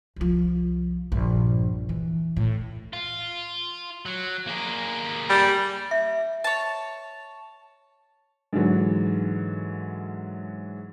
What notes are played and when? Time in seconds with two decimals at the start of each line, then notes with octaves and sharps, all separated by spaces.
0.16 C2 F3
1.12 A#1 G2
1.89 E3
2.37 A2
2.93 F4
4.06 F#3
4.47 A#3 G#4
5.29 G3
5.91 E5
6.44 C#5 A5
8.53 G#2 D3 E3 F#3